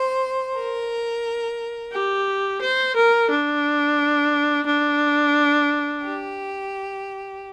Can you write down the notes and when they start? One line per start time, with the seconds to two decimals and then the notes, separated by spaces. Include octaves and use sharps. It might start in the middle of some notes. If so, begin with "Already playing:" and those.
Already playing: C5
0.55 A#4
1.92 G4
2.61 C5
2.95 A#4
3.29 D4
4.66 D4
6.03 G4